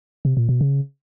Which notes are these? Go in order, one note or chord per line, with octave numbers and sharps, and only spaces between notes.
C3
A#2
B2
C#3